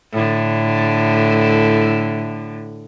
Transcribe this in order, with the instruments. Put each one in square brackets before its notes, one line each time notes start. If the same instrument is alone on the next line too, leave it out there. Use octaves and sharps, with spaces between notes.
[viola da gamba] A2 D3